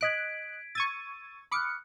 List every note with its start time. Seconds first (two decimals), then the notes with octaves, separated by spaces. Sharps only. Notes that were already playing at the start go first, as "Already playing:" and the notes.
0.01 D#5 F#6 G#6 B6 D7
0.75 C#6 E6 G#6 A6 D#7
1.51 B5 D6 D#6 F6 F#6 C#7